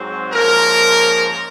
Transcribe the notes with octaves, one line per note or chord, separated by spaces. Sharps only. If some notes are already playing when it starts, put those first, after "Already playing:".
Already playing: G#2 F#3 C4
G#2 F3 A#3 C#4 A#4